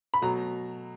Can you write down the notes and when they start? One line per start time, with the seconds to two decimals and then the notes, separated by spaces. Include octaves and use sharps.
0.14 B5
0.22 B2 F#3 A3 A#5